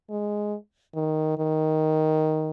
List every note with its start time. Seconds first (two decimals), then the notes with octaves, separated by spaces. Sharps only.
0.10 G#3
0.95 D#3
1.38 D#3